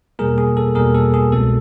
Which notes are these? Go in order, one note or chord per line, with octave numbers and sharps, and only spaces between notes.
E2 B2 G3 A#3 G#4 A#4
G#4
A4
E2 B2 G3 A#3 G#4 A#4
A4
G#4
C2 B2 G#3 C4 A4